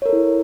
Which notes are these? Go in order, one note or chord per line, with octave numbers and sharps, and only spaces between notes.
E4 A4 A#4 C#5